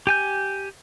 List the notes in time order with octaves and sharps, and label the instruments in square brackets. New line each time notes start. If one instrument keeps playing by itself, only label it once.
[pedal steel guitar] G4 G#5 G6